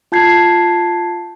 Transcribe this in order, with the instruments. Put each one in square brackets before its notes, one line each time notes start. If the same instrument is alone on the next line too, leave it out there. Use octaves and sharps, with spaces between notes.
[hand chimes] F4 A5 G6 G#6 C7